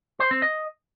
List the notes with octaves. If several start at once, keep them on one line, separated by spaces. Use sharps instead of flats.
C5
C4
D#5